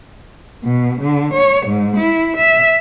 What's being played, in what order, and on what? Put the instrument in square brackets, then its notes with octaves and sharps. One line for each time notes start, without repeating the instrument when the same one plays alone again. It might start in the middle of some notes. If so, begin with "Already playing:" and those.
[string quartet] B2
D3
C#5
G#2
E4
E5